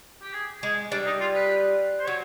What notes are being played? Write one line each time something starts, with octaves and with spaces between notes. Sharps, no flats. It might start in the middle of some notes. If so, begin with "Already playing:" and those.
G4
G#4
G#3 G#4
G3 D4
D#4
F4
B4
C5
F#3 C#5